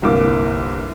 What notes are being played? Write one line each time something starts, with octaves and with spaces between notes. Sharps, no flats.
G1 C2 A#3 D6